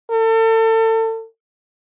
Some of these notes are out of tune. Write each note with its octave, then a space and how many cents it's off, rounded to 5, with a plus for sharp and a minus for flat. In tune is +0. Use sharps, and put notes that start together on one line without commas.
A4 +35